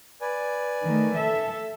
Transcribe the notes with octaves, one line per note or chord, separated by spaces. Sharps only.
B4 D5 G#5
D#3 A3
A4 E5